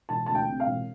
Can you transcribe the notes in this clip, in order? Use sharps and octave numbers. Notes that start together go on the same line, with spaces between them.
E1 A5
D2 A5
G5
C3
F5
E1